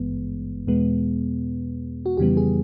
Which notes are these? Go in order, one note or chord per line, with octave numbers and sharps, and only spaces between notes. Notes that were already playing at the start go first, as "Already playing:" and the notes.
Already playing: G#1 G2 E3 G#3 B3
E2 B2 G#3 B3
F#4
F2 C#3 E3 G3 B3 G4
G#4